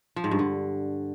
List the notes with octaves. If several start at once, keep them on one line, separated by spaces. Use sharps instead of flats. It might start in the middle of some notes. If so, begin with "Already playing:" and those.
F3
G#2
G2
D3